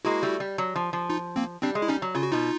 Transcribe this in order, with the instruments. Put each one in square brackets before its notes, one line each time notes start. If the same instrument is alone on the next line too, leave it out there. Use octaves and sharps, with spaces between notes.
[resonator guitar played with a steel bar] G#3 A#3 [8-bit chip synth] E4 F#4
[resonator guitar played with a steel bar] G3 A3
G3
F#3
F3
F3
[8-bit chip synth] D#4 F4
A#3 C4
[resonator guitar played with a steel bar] G3 [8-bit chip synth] C4 D4
[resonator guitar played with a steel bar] G#3
[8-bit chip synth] E4
[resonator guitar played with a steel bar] G3 [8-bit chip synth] C#4 D#4
[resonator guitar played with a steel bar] F#3
[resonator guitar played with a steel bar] C#3 [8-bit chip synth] F4
[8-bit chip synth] F#4
[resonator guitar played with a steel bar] B2 [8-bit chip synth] D#4 F4